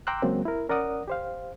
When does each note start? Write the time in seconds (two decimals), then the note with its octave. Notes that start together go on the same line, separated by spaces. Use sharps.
0.07 G5 A#5 C6 D6 E6 F#6
0.22 C#3 F#3 G#3 A#3 C4
0.45 E4 A#4
0.69 C#4 A#4 D5 F#5 D#6
1.08 G4 C5 F5